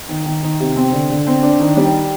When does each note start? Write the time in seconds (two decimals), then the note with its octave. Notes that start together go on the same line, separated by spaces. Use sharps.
0.09 D#3
0.26 D#3
0.43 D#3
0.60 C3
0.76 C4
0.92 D3
1.10 D3
1.27 C4
1.42 D4
1.60 D#3
1.77 G3